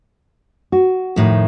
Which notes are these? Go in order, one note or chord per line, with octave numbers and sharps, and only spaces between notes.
F#4
F2 A2 D#3